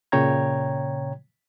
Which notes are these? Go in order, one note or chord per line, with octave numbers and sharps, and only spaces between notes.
A#2 C#3 C#5 G5 A#5 G#6